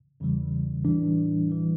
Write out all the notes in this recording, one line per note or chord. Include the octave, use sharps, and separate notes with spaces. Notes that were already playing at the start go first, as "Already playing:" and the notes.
E2 C#3 E3 G3
A2 E3 G3 D4
E3 G3